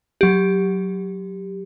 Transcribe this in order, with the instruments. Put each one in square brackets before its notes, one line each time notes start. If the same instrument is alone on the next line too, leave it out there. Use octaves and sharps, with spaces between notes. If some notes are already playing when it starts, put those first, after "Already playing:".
[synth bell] F#3 G4